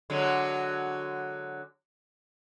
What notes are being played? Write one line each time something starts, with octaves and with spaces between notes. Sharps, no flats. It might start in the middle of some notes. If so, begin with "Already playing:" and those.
D3 F#3 G#3